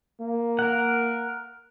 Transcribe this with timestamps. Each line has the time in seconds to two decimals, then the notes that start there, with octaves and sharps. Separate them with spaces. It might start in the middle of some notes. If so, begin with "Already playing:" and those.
0.20 A#3
0.59 A#4 F#5